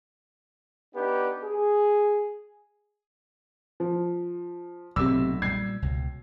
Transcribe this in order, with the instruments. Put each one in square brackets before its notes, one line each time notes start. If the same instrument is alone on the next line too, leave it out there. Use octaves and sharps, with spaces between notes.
[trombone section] B3 D4 D#4 G4 B4
G#4
[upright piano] F3
[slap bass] B1 A2 [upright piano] C3 E6
[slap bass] A#2 G3 [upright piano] G#6 C7
[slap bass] C#2 B2